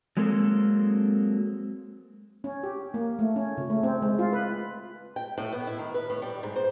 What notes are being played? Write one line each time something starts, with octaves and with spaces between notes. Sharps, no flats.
F#3 G#3 A#3 C4 A4
C#4
G4
A#3
A3
C#4
C#3
A3
C4
G#3
F4
B4
G5
A2
B3
E4
D#3
B4
A2
G3
G#2
C5